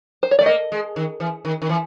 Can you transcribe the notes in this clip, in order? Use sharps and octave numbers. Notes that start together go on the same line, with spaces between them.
C5
C#5
A3 D5
A#3 D#5
G#3
D#3
E3
D#3
D#3
E3